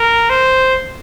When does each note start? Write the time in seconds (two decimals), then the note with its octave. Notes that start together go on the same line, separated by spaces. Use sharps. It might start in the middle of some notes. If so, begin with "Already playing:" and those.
Already playing: A#4
0.30 C5